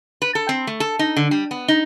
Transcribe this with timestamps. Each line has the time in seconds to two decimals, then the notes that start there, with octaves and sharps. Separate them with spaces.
0.22 B4
0.35 A4
0.49 C4
0.67 A3
0.80 A4
0.99 D#4
1.16 D3
1.31 G3
1.51 B3
1.68 D#4